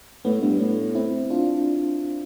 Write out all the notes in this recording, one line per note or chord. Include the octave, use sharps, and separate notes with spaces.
A2 B3
G2
A2 B3
C4 E4
D4 F4